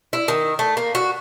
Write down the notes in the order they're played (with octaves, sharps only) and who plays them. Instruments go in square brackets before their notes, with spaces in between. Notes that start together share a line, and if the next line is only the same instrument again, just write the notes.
[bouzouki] E4
D#3
A3
A#3
F#4